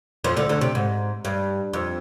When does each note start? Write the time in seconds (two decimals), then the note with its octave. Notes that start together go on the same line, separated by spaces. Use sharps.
0.24 F2 F3
0.36 D2 D3
0.49 D2 D3
0.61 C3
0.75 G#2
1.25 G2
1.73 F2